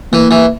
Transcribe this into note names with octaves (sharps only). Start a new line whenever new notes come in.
E3 A#3
E3